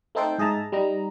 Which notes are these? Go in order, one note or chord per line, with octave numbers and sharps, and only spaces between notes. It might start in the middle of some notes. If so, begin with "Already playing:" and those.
A3 C4 D#4 A4 C5 G5
G#2 G#4 D#5 E5 A5 A#5
G3 D#4 A#5